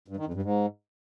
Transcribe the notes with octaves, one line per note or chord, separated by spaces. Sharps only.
G2
D#3
F2
G2
G#2